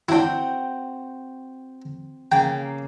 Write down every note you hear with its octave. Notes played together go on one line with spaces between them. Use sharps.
C4 D4 E4 F#4 G5
C#3 A#3 G5